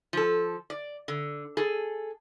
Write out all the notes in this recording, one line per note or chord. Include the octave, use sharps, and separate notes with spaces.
F3 A4
D5
D3
G#4 A4